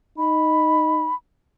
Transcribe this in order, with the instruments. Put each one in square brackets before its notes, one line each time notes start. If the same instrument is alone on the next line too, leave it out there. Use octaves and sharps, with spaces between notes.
[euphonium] D#4 [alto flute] B5